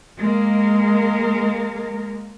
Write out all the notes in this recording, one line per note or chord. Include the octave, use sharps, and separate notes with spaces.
G#3 A#3 A#4